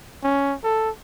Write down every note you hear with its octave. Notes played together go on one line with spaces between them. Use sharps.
C#4
A4